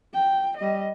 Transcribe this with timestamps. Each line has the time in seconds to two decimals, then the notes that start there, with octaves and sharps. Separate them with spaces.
0.14 G5
0.58 G3 D#5